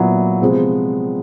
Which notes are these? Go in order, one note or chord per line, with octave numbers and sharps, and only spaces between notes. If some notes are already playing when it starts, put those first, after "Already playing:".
Already playing: A#2 F#3 B3 E4
C3 F3 G#3 B3